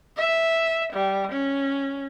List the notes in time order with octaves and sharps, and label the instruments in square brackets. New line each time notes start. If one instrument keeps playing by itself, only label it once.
[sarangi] E5
G3
C#4